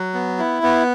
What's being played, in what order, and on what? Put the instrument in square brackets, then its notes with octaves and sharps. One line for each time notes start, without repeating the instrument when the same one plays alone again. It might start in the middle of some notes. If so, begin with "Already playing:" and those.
Already playing: [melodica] F#3
B3
E4
B3